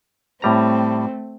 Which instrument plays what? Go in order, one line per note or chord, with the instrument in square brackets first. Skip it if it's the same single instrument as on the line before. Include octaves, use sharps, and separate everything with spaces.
[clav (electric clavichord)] A2 G3 A#5 [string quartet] A3 C4